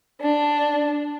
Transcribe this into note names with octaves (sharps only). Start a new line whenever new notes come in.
D4